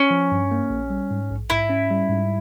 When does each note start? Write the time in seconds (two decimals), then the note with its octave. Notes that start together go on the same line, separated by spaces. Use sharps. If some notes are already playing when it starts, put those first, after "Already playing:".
Already playing: C#4
0.11 F3
0.32 G2
0.51 A#3
0.70 A#1
0.90 G3
1.11 G#2
1.30 A#1
1.50 G#2 E4
1.70 C#4
1.91 G3
2.09 G#2